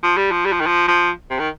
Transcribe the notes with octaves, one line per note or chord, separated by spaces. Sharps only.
F3
G3
F3
G3
F3
D#3
F3
F3
C3
D#3